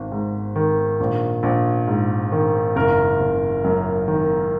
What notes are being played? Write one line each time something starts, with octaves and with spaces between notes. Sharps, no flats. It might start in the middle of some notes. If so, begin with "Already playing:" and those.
Already playing: G#1
G#2
D#3
A#1
A#1
G#2
D#3
F#1 A#4
F#1
F#2
D#3